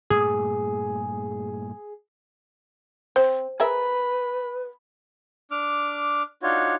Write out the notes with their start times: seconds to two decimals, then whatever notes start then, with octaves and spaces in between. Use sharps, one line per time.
0.10 G2 A#2 A3 G#4
3.16 C4 C5
3.60 G#4 A#4 B4 E5 B5
5.51 D4 D6 F6
6.43 D4 D#4 F4 F#4 C#5